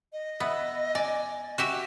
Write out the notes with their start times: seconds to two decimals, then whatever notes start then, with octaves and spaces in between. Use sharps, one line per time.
0.13 D#5
0.40 B3 E5 F#6
0.95 D5 G#5
1.58 F#4 G4 E5